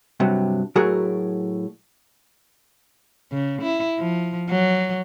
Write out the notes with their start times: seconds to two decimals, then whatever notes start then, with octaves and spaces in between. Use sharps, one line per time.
0.20 G2 C3 F#3
0.76 A2 F#3 F#4 G#4 A#4
3.32 C#3
3.62 E4
3.99 F3
4.49 F#3